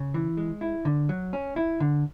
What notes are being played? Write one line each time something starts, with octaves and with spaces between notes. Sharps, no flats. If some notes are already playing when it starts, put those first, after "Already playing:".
Already playing: C#3
E3
G#3
E4
D3
F#3
C#4
E4
D3